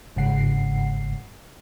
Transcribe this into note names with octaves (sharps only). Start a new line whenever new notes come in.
G1 G#2 C#3 F#5 C7